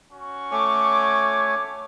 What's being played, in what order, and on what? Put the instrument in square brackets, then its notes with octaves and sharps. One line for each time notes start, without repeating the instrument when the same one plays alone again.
[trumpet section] C#4 F#4 C#6
[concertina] A3 C#5 G#5 [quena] D6